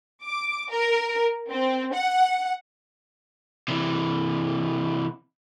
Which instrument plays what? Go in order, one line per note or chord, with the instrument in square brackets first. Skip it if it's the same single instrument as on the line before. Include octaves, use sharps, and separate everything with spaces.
[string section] D6
A#4
C4
F#5
[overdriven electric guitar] C3 E3